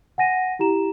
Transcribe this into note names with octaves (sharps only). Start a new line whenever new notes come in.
F#5 G#5 A#6 D#7
E4 G4 A#5 E7